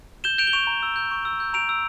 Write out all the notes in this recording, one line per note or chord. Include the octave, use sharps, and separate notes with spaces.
G6 E7 G7
G6 D7 F7
G7
C#6 D7 F7
A#5
E6
G6
C#6
E6
G6
A#5 D7 F7
E6